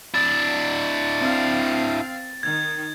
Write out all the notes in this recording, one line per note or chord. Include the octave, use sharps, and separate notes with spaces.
D4 E4 A6
C4 F5
D#3 G#6